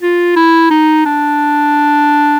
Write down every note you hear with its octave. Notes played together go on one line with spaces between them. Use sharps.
F4
E4
D#4
D4